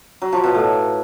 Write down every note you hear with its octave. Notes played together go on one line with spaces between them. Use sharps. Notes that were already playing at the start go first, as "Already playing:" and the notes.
F#3
F3
B2
A2